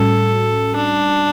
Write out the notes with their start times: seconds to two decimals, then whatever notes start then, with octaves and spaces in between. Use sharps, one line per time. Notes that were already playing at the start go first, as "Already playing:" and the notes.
Already playing: A2 G3 C#4 F#4 A4
0.76 D4